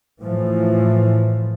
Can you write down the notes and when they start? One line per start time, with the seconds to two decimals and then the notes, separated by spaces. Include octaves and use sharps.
0.21 A2 E3 F3